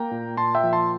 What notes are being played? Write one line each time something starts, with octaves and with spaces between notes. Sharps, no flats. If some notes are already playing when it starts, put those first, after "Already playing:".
Already playing: A#3 G5 A#5
A#2
A#2 A5 C6
E5 G5
F3
A5 C6